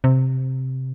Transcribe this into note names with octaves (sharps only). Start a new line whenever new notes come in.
C3